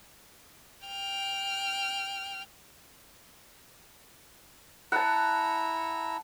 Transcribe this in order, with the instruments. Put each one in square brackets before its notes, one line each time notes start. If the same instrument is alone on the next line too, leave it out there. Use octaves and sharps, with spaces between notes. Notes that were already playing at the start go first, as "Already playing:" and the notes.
[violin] G5 F6
[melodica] E4 A#5 E6 [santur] F#5 A5